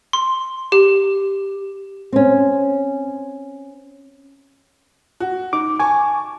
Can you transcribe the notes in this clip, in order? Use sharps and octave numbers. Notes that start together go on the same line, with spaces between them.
C6
G4
C4 C#4
F#4
D#4 D6
G#5 A5 C#6 D6